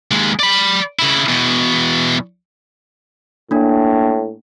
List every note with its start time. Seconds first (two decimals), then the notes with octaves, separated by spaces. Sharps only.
0.11 D#2 G#3
0.39 D5 B5
0.99 C#3 E4
1.29 E2 B2
3.51 A2 A#3 D4